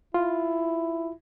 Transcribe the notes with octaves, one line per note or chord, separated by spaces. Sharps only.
E4 F4